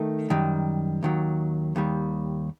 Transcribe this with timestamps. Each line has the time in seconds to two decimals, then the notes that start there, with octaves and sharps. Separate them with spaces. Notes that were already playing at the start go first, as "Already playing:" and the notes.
Already playing: D#3 A3 D#4
0.30 F#2 D#3 G3
1.03 D#2 D#3 F#3
1.76 D#2 D#3 G3